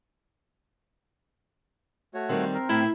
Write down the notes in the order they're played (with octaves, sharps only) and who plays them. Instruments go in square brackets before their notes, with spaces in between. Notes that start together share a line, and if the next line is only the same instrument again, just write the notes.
[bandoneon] A3 F#4 C#5
[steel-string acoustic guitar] D#3 G3 [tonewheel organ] C4
[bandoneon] A#4
[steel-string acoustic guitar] A2 [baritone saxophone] E4